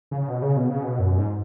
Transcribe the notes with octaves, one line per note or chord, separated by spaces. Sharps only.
C#3
B2
C#3
B2
C#3
B2
F#2
G#2